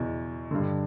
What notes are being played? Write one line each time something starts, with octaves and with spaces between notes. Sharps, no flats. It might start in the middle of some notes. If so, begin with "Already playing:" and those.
Already playing: E2 B2
G2 D3